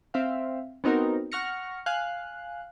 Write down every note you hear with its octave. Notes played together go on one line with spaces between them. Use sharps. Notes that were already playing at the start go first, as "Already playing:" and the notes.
C4 E5 F5
B3 C4 D#4 F#4 A#4
F#5 C#6 F6 A#6 C#7
F5 G#5 F#6